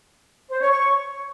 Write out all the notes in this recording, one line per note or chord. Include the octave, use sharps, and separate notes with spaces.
C5
C#5
C#6